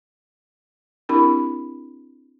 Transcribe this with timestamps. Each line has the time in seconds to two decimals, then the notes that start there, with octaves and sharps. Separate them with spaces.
1.09 C4 D4 E4 G4 A#4 B5